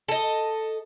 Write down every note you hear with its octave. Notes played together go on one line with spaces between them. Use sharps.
A4 D#5